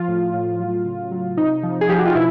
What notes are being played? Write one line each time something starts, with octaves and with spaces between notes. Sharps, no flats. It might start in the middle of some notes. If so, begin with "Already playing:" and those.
Already playing: F3 F4
A2
A2
F#3
C#3
F#3
C3 D#4
F3
G#4
F3 G4
F#4
F4
B2 E4